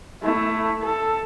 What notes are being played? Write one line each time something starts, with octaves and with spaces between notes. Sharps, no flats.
A3 E4
A4